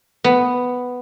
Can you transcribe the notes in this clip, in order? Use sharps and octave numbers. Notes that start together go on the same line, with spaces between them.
B3